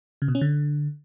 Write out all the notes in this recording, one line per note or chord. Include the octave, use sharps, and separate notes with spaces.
C#3
B2
C#4
D3